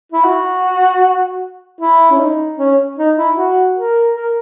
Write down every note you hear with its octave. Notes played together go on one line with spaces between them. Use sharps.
E4
F#4
E4
C#4
D#4
C#4
D#4
E4
F#4
A#4
A#4